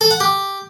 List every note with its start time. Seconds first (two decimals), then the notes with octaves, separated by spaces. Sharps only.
0.01 A4
0.11 F#5
0.20 G4